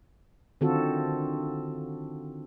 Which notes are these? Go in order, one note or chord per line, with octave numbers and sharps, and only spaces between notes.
D3 D#3 C4 F4 F#4 A4